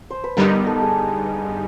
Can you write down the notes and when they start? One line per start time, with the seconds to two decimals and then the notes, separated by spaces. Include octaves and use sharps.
0.10 C5
0.24 B4
0.37 G2 D3 G3 B3 D#4 A#4
0.67 A4
0.82 G#4